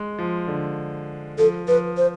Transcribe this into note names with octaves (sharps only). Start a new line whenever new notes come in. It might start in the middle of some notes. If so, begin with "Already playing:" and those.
Already playing: G#3
F3
D3
F3 A4
F3 B4
C5